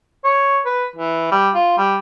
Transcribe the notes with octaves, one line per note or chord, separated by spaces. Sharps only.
C#5
B4
E3
G3
F4
G3